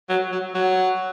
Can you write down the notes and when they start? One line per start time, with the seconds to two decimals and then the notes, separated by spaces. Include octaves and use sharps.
0.09 F#3
0.32 F#3
0.54 F#3